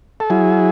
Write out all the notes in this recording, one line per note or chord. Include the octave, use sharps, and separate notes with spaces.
A4
F#3 E4 G#4